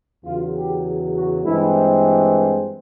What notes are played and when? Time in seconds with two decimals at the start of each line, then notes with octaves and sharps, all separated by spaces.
0.25 E2 C#3 F#3 F4
0.55 G4
1.14 F#4
1.44 G2 E3 G#3 C4 E4